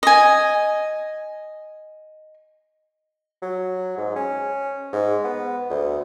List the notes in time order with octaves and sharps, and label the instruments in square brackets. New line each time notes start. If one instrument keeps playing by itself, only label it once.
[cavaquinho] D#5 G#5
[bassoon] F#3
G#2
C#4
G#2
B3
D2